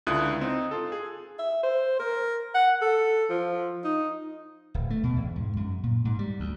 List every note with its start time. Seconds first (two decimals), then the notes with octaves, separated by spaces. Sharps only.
0.07 C#2 D3 E4 F4 D#6 F#6
0.41 C4 D#4
0.71 F4 A4
0.92 G#4
1.39 E5
1.63 C5
1.99 A#4
2.55 F#5
2.82 A4
3.30 F3
3.84 D#4
4.74 D1
4.90 A3
5.04 B2
5.16 E2
5.36 G#2
5.57 F#2
5.83 A#2
6.05 G#2
6.19 G3
6.40 D2